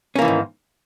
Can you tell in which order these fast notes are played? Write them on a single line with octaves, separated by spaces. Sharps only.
C#4 A#3 E3 D#3 G#2